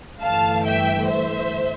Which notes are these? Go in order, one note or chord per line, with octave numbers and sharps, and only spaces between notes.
G1 G2 E3 A3 F5 A5
E5 G5
C5 E5